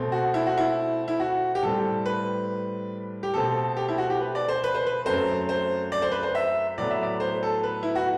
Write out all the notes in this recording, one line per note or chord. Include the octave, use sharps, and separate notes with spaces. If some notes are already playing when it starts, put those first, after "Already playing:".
Already playing: B2 A3 C4
F#4
E4
F#4
E4
E4
F#4
G4
A2 G3 C4 A4
B4
G4
B2 A3 C4 A4
G4
E4
F#4
G4
B4
D5
C5
B4
C5
B4
F#2 F#3 A3 C4 C5
C5
D5
C5
B4
C5
E5
A2 F#3 B3 D5
E5
D5
C5
A4
B4
E4
F#4